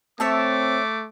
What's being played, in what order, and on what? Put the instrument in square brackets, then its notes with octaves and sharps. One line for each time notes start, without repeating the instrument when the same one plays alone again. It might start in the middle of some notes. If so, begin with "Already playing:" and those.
[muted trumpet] A3 [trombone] C4 [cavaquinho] C#5 E5 A5 [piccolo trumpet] D6